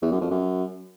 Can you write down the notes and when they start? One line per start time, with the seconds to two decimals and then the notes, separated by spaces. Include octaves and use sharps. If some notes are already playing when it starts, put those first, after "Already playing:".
0.02 E2
0.11 F#2
0.21 F2
0.30 F#2